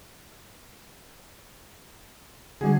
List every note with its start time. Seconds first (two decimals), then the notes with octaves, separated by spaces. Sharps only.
2.61 D3 F3 G3 G#3 F#4 G#4